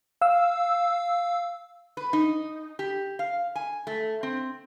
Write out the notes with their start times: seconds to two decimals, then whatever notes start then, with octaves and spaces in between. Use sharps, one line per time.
0.21 F5 E6
1.97 B4
2.13 D#4
2.79 G4
3.19 F5
3.55 G#5
3.87 A3
4.23 C4